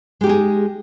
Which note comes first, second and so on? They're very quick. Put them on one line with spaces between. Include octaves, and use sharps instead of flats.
G#3 G4 D#4 G#4